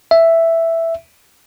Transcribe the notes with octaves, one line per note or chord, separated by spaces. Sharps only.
E5